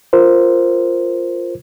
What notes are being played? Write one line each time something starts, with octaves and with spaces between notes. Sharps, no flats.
F4 A#4 C5